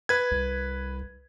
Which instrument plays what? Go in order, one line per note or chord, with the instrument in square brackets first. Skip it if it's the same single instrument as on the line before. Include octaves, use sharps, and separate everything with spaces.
[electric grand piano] B4 G#6
[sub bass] C2